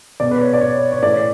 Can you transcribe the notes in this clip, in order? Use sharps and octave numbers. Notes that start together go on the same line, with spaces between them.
B2 D5
B4
C#5
D5
C#5
C#5
A2 E3 D5